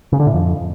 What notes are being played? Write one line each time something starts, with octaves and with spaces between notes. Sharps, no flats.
C#3
D3
A2
F2